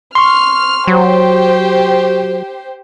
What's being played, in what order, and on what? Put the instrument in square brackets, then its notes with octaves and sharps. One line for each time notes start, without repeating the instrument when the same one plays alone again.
[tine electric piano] C6 C#6 [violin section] F6
[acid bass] F#3 [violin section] G4 C5